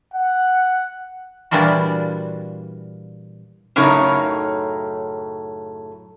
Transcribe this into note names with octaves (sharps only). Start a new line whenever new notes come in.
F#5
A#2 E3 G3 D4 F4 F#4
F#2 A2 C#3 D#4 A#4 C#5